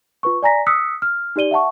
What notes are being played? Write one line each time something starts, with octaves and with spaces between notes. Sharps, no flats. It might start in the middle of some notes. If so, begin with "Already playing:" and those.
F4 B4 C#6
D5 G#5 A#5 A#6 B6
D#6 E6 F#6 B6 C#7
F6
D#4 G4 D5 D#7 G7
E5 F#5 A5 C#6